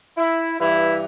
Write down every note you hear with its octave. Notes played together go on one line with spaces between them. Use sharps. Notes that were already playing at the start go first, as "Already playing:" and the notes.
E4
G2 E3 E4